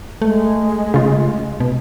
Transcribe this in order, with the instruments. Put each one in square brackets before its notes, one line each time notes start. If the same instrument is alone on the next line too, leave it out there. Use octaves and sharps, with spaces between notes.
[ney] G#3 [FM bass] A3
[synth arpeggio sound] C#3 F4
[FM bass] B2